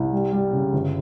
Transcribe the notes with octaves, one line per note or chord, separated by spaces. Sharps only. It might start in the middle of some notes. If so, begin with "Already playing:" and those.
Already playing: C2
G3
G3
C#3
G1